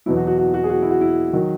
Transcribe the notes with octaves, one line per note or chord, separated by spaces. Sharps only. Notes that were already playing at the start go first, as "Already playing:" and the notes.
E2 B2 F#3 E4
F#4
F#4
F#4
F#4
G#4
F#4
E4
F#4
E4
D#3 F#3